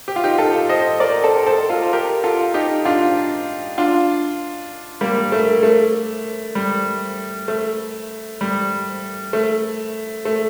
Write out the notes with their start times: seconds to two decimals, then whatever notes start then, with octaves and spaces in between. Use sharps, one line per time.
0.08 G4
0.16 F4
0.24 D#4 G4
0.38 F4 A4
0.69 C5 D#5
1.00 A#4 D5
1.24 A4 C5
1.46 A4 C5
1.69 F4 A4
1.93 G4 A#4
2.24 F4 A4
2.54 D#4 G4
2.85 D4 F4
3.78 D4 F4
5.01 G3 A#3
5.32 A3
5.63 A3
6.55 G3
7.48 A3
8.41 G3
9.33 A3
10.25 A3